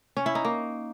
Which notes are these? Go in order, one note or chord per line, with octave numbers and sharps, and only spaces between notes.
C#4
E4
D#4
A#3